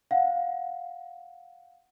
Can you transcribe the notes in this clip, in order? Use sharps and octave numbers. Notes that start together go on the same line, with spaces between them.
F5 F#5